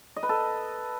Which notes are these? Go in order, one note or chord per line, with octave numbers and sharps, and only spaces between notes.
D#5
B4
A4